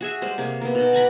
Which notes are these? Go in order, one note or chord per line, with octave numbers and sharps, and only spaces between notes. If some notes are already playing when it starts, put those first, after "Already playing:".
F#4 G#4 E5
G3 G#3 C5
C3 A#3 G#4
A#3 B3
B2 D#4
D5 G#5 A#5 B5